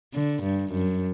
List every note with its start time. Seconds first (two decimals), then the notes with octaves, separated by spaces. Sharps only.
0.14 D3
0.43 G2
0.72 F#2